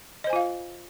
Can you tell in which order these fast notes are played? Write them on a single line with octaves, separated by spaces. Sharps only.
D#5 C5 G#5 F4 F5